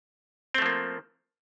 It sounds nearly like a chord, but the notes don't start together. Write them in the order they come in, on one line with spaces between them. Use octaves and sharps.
C4 A3 F3 A#3